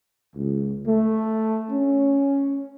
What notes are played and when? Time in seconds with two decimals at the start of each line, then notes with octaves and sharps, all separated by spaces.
0.35 C#2
0.86 A3
1.70 C#4